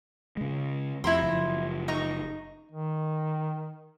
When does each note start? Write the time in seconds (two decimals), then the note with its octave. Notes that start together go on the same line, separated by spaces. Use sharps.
0.37 C#3 G#3
1.04 F2 E4 A#5 C6
1.22 F#1 F3
1.88 D#4 A#5 C#6
2.72 D#3